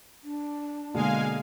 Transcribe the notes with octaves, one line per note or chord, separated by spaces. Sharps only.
D4
B2 D3 G#3 A#3 F5 G#5